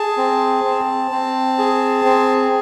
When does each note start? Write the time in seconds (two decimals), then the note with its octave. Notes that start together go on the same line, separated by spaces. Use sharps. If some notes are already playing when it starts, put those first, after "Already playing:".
Already playing: G#4 A5
0.17 C4
0.64 C4
1.11 C4
1.58 G#4
2.05 C4